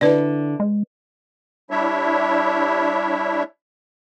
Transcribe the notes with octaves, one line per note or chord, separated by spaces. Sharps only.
D3 E4 B4 D5
G#3
G3 D4 E4 C#5 E5